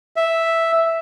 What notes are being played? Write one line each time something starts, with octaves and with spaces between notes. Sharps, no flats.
E5